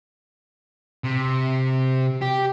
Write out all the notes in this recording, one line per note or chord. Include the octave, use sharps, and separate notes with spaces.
C3
G4